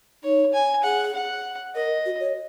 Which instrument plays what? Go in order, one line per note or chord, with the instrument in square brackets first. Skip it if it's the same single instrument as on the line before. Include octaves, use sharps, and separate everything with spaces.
[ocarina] D#4 [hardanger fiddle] C#5
[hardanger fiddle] G#5
[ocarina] G#4 [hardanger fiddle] F#5
[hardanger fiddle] F#5
[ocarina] A#4 [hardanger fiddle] D#5
[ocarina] F#4
C#5